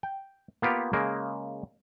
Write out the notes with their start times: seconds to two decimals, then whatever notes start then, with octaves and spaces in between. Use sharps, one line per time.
0.03 G5
0.62 A#3 B3 F4 G4
0.93 C#3 G#3 A#3